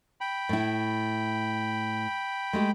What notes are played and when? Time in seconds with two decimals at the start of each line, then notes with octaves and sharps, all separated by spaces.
0.21 G5 B5
0.49 A2 E4
2.53 G#3 A3 G4